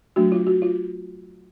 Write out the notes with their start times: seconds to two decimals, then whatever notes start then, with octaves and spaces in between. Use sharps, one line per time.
0.16 F#3 A3 D4 F#4
0.32 F4
0.47 F#4
0.62 F4